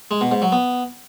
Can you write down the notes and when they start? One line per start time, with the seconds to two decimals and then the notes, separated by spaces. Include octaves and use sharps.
0.11 G#3
0.21 B2
0.32 G#2
0.42 F#3
0.52 B3